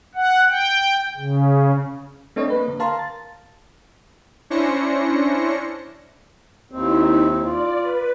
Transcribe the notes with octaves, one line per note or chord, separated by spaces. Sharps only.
F#5
G5
C#3
A3 C4 D4 C#5 D#5
A#3 B4
D3
A#4 F5 A5 A#5 C6
A6
C#4 D4 E4 C5 A#6 C#7
D#2 C4 D#4 E4
F4 D5
B4